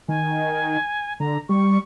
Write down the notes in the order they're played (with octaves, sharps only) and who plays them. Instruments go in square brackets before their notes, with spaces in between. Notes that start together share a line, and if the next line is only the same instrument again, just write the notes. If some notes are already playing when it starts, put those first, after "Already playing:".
[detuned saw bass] D#3 [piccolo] G#5
[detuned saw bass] D3 [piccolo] A#5
[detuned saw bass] G3 [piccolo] C#6